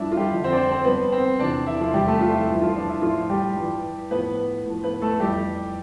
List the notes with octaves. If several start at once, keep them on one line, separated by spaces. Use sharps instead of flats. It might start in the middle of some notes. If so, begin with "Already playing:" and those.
Already playing: G2 F3 D4 E4
F4
G3 G4
F2 D3 F3
C4 C5
D5
C4 C5
C4 C5
G2 F3 B3 B4
C4 C5
E2 C3 F3 D4 D5
E4
F3 F4
E2 C3 F3 G3 G4
A3 A4
F3 F4
E4
G2 E3
F3 F4
D4
E4
A2 F3 F4
G3 G4
G2 E3
A2 F3 B3 B4
A2 F3
B3 B4
A3 A4
F2 E3 G3 G4